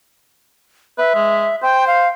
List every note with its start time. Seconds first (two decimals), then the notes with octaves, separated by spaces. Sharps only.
0.98 B4 E5
1.15 G#3
1.63 C5 G5
1.87 F5